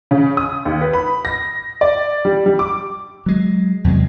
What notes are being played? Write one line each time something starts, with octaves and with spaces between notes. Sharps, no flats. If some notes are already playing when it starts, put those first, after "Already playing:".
C#3
D#6
D#2
B4
B5
A#6
D5
G3
G3
D6
F#3 G#3
E2 C3 F#3 G#3